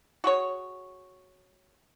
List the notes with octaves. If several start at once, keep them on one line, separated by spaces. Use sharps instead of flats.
F#4 G#4 C#5